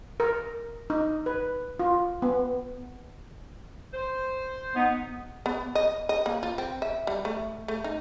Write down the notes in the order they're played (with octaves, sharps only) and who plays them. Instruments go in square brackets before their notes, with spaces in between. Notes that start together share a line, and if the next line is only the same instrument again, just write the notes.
[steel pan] A#4
D#4
B4
F4
B3
[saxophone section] C5
[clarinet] B3 [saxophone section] D#4
[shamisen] B3
D#5
D#5
A#3
F4
C4
E5
G3
A3
A3
D#4